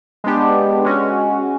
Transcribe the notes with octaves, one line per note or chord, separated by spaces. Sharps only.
G#3 B3 D4 G4
G#3 C#4 F#4